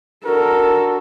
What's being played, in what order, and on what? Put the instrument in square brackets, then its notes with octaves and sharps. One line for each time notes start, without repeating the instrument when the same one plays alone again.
[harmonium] D4 F#4 [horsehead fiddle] A4 [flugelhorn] A#4